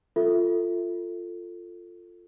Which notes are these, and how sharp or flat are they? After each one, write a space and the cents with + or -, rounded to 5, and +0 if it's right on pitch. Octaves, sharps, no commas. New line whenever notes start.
F4 +0 A4 +15 E5 +0